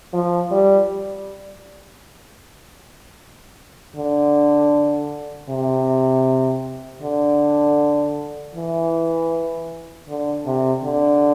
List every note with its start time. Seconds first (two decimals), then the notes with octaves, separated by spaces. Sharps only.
0.13 F3
0.51 G3
3.96 D3
5.49 C3
7.02 D3
8.55 E3
10.08 D3
10.46 C3
10.84 D3